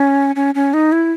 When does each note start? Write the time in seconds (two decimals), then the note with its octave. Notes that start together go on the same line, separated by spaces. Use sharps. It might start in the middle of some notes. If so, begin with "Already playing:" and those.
Already playing: C#4
0.36 C#4
0.55 C#4
0.74 D#4
0.92 E4